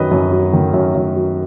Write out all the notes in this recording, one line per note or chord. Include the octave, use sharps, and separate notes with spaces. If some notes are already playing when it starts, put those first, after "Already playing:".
Already playing: F#2 D#3 B4 D#5
F#2
F#3
D#3
F#2
F#2
F#3